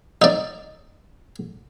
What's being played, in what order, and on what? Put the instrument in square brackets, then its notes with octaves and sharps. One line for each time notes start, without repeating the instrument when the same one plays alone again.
[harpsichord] D#4 D5